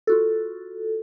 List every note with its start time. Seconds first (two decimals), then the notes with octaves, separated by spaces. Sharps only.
0.07 F4 F#4 A4